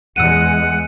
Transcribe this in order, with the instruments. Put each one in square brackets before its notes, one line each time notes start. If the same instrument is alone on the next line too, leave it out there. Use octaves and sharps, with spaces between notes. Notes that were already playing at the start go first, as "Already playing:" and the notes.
[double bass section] E2 G#3 [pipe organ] F#5 [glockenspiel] E6 C#7 D#7